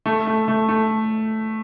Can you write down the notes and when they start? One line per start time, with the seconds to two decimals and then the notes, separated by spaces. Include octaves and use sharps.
0.06 A3
0.27 A3
0.48 A3
0.69 A3